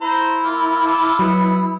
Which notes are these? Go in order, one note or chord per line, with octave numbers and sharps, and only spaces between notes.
E4 C5 A#5
A#3 F4
F4 A4 D6
F#3 B3